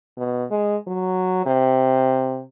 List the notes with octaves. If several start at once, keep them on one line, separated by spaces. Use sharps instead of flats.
B2
G#3
F#3
C3